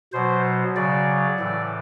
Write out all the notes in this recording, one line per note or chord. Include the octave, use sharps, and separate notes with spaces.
B2 F#3 C5
C#3 F#3 D5
A2 E3